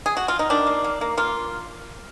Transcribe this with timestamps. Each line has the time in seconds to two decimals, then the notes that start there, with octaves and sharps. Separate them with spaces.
0.06 G#4
0.17 F#4
0.28 F4
0.39 D#4
0.50 D#3 D4
0.67 A#3
0.84 A#3
1.01 A#3
1.17 A#3 F4